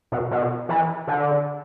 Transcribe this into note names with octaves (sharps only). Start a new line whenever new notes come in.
B2
B2
E3
D3